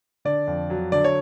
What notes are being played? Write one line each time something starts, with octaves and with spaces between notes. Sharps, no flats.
D3 D5
F2
F#3
D3 D5
C#5